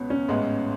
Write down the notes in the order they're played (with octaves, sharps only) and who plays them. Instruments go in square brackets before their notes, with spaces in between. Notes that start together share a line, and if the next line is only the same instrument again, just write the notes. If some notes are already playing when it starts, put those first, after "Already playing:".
Already playing: [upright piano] C#2 B2 [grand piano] B3 C#4
[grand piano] C#4
[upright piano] A1 G#2 G#3 B3